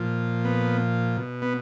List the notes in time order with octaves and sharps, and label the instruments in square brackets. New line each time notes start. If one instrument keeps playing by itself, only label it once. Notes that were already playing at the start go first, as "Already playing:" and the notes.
Already playing: [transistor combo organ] A#2 F3
B3
B2
B3